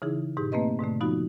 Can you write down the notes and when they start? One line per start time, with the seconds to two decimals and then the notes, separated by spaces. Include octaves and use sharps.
0.02 C#3 E3 D#4 E4 G#4
0.37 G#2 B2 D#4 G4 G#4
0.52 A3 A#3 C4 B4 D#5
0.79 G#2 B2 D3 A3
1.00 F3 B3 D#4 F4 F#4